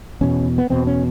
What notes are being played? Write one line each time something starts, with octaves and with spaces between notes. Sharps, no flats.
E2 B2 C#4
B3
E2 B2 C4
C#4